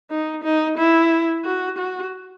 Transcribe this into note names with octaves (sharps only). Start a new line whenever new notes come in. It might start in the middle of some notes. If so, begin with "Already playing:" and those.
D#4
D#4
E4
F#4
F#4